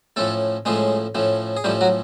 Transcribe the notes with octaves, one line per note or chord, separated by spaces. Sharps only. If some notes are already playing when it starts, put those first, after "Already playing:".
A2 F3 A3 C#4 A4
A2 F3 G#3 A3 C#4 G#4
A2 F3 A3 C#4
G#4
A2 F3 G3 A3 C#4 G4
F#3 F#4